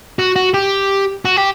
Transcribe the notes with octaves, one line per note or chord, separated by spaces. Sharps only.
F#4
F#4
G4
F#4
G4